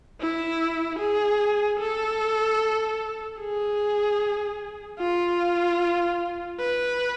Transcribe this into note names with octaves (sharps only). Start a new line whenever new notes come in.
E4
G#4
A4
G#4
F4
B4